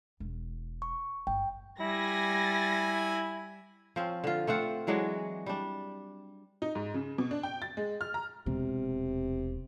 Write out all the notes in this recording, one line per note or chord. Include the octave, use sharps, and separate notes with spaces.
E1
C#6
G1 G5
G3 E4 G#5 A#6
F3 C4 C#4
D3 F4
A3 C4 F4 F#5
E3 F#3 G#3 D4
G3 D4
D#4
G#2
C#3
B2
D4
G5
A6
G#3
F6
A#5
E1 C3